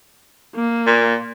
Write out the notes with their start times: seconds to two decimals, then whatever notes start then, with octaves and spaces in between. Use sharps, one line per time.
0.55 A#3
0.87 A#2